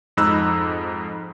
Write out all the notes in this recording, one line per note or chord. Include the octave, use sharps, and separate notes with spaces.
F2 G#2 D#4 B5 E6 F#6